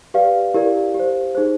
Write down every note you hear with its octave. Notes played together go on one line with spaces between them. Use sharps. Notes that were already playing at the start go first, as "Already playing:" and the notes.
G4 B4 D5 F5
E4 G4 A#4 D5
G4 C5
D#4 G#4 C5